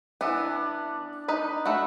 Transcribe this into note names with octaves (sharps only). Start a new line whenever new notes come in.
E3 B3 D4
D#4 B4 B5
A3 F#4 B5